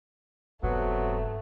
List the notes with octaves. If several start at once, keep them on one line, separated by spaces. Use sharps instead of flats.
F1 G#2 C3 F#3 A3 B3